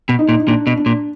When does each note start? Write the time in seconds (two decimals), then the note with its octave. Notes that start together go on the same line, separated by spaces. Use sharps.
0.09 B2
0.19 D#4
0.29 A#2
0.40 D#4
0.48 A#2 D4
0.67 B2
0.77 D4
0.86 A#2